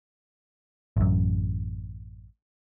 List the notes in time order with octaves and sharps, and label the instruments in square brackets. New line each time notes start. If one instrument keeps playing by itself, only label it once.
[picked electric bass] A1 F#2